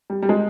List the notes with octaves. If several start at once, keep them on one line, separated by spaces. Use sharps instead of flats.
G3
G3
G#3